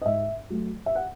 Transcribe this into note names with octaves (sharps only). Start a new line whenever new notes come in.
D#5
G#2 E5
F#3 A3
E5
F#5